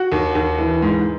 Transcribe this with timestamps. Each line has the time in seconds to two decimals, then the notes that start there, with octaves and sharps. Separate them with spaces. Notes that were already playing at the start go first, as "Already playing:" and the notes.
Already playing: F#4
0.12 D#2
0.35 D#2
0.58 E3
0.82 G#2